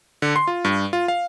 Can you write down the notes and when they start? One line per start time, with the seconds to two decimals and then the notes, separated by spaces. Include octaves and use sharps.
0.22 D3
0.36 C6
0.48 F4
0.65 G2
0.93 F4
1.08 F5